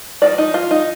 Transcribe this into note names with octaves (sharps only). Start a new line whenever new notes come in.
F3 A#3 D#4 D5
D#4
F4
D#4